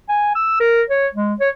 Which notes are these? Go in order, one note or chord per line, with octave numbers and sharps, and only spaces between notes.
G#5
E6
A#4
C#5
G#3
C#5